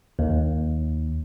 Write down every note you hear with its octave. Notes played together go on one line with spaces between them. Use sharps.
D#2